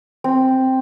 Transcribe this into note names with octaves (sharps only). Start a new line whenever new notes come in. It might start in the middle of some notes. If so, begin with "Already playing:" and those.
C4